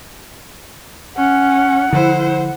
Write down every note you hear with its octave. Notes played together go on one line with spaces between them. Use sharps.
C#4 F#5
D3 F3 E4 C5